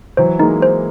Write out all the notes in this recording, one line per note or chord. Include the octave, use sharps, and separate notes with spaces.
E3 F#3 C5
G#3 A#3 D#4
C5